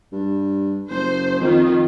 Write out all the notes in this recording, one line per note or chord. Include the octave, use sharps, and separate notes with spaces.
G2
F#1 C5
F2 D#3 F4